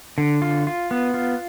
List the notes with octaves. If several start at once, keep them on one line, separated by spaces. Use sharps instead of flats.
D3
F4
F4
B3
F4